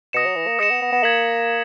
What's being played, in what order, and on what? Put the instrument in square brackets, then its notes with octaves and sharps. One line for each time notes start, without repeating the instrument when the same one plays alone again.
[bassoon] B2 [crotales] D#6 A#6 C#7 E7
[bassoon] F#3
E3
A#3
[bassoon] G#3 [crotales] D#6 A#6 C#7 E7
[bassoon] B3
B3
B3
[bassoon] A#3 [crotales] G#6 B6 F#7